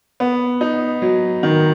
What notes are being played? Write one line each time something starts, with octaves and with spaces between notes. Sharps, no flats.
B3
D#4
F#3
D#3